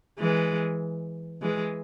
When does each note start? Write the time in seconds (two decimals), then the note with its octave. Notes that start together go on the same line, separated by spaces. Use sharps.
0.18 E3 G#3
1.42 E3 G#3